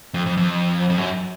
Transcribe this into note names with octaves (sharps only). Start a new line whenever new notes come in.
F2
F2
F2
F2
F#2